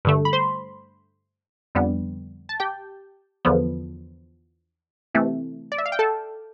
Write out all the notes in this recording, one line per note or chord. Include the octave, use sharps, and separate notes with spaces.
G2 D3 A3
B5
C5 C6
F2 D3 G3 B3
A5
G4 G5
E2 D3 F3 B3
C3 E3 A3
D5
E5
F5
G5
A4 A5